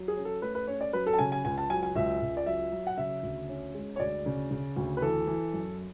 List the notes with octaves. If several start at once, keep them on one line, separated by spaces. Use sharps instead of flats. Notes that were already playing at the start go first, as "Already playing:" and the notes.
Already playing: F#3
G#4
C#4
A4
A3 B4
B4
C#4 C#5
D5
F#3 B4
A4
A5
C#3 G#5
G#5
C#2 G#5
A5
F#3 G#5
G#5
C#2 E5
C#2
D5
F#3 E5
F#3
F#5
C#3 E5
D2
C#4
G#3
C#5
D2 D5
C#3
C#3
D2
B4
E3 A4
E3
F#2